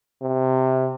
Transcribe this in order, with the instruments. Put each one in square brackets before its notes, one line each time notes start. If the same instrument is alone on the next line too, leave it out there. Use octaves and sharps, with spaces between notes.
[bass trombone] C3